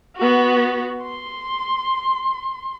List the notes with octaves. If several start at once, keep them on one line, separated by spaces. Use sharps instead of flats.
B3 F#4
C6